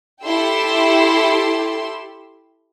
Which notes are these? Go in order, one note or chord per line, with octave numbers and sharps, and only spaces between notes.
E4 G4 A4 G5 C6 E6